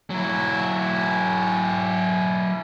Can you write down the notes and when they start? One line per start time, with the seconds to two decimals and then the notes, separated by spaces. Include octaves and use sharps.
0.10 F#3 E4